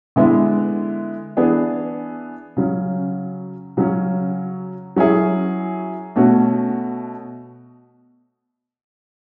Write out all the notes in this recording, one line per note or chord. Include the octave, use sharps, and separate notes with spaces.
D3 G#3 B3 E4
E3 B3 D4 G#4
C#3 F#3 C#4
C#3 F#3 C#4
F#3 C#4 E4 G#4
B2 A3 C#4 F#4